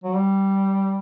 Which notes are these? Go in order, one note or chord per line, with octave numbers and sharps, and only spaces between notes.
F#3
G3